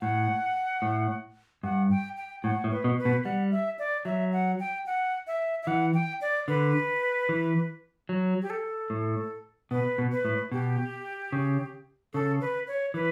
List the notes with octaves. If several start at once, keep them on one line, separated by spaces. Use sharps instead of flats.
A2 F#5
A2
G2 F#5
G5
G5
A2 F#5
A2
B4
B2
B4
B2
G3 F#5
E5
D5
F#3 E5
F#5
G5
F#5
E5
E5
E3 F#5
G5
D5
D3 B4
E3
F#3
G4
A4
A2
B2 B4
B2
B4
A2
B2 G4
C#3
C#3 A4
B4
C#5
E3 B4